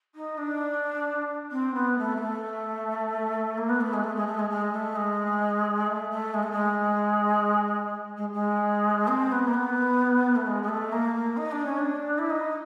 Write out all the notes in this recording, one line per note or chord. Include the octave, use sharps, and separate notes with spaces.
D#4
D4
C4
B3
A3
A#3
A3
A#3
B3
A3
G#3
A3
G#3
A3
G#3
G#3
A3
G#3
A3
A3
G#3
A3
G#3
G#3
G#3
C4
B3
A#3
B3
A3
G#3
G#3
A3
A#3
D#4
D4
C#4
D4
E4
D#4